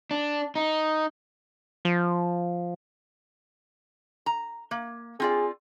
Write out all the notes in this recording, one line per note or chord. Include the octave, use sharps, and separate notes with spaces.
D4
D#4
F3
A#5
A#3
C4 F4 G#4 D5